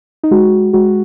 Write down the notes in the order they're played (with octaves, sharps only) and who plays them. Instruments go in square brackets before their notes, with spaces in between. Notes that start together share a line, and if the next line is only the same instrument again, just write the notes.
[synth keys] D#4
G#3 F#4
G#3 F#4